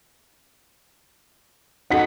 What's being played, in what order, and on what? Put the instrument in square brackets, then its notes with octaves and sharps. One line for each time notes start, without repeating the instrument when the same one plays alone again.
[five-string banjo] D#4 F#4 A4 [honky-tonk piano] F#5 B6